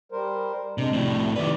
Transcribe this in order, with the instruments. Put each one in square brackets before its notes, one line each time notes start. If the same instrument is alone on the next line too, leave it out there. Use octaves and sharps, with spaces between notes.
[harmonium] G3 A#4 C5
[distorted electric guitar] C3 [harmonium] G#3 D4
[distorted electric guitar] F2 A2 [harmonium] G3
[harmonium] A3
[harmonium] C3 D5 [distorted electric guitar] D#3 B4